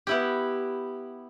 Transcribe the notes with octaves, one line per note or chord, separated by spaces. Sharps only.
B3 E4 G4